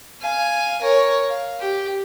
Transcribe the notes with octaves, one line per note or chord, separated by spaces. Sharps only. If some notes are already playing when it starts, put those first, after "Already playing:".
F5 G#5
A#4 C#5
F5
G4